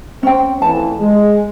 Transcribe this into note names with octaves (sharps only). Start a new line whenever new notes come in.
C4 C#4 G5
F2 A2 E3 A5
G#3